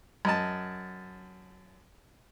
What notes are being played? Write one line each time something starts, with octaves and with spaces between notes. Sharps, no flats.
F#2 D#5 A5